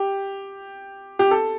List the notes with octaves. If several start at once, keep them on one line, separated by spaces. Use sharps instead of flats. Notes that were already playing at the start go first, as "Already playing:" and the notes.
Already playing: G4
G4
A4